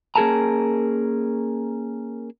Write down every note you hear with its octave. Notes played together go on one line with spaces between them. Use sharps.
A#3 C#4 G#4 A#4 A5 A#5